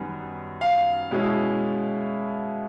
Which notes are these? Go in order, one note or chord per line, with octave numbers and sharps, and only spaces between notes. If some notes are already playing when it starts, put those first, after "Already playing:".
Already playing: F#2 D#3 G3 B3
F5
B2 G#3 C#4 E4